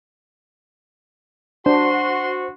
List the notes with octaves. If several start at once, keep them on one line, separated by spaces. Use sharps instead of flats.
D4 F#4 C5 C6